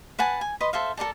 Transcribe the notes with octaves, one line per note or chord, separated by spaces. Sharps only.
B4 F#5 G#5 A5
G#5
B4 D#5 C6 D#6
A4 C5 E5 F5
A4 A#4 D5 A5